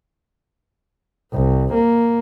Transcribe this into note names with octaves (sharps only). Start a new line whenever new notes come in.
C2
A#3